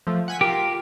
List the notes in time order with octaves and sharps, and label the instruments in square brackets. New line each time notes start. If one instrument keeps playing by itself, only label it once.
[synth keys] F3 A3
F#5 G#5 B6
[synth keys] F4 A#4 [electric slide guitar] G4